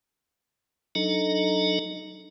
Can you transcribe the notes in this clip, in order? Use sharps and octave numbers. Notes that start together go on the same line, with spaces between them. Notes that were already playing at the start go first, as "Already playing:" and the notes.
F#3 D4 D#4 A4 D#5 A#5